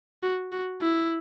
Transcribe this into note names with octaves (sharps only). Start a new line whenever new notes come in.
F#4
F#4
E4